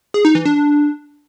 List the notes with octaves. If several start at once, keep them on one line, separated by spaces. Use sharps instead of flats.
G#4
D#4
E3
D4